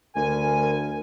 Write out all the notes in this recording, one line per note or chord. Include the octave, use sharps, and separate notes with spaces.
D2 A#4 G#5